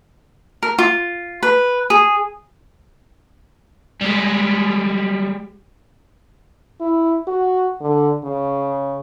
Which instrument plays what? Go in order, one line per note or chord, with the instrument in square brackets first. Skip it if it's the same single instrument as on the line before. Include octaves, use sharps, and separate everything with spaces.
[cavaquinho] A#4
F4
B4
G#4
[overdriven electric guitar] G3 G#3
[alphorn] E4
F#4
D3
C#3